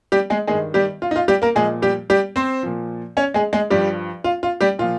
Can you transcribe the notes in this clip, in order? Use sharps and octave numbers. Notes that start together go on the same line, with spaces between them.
G3 G4
G#3 G#4
G2 D#3 G#3 G#4
G3 G4
F4
D#4
F4
G3 G4
A#3 A#4
A#2 F3 G#3 G#4
G3 G4
G3 G4
C4 C5
A#2 F3
C#4 C#5
G#3 G#4
G#3 G#4
G2 F3 G3 G4
F4
F4
G3 G4
A#2 F3 F4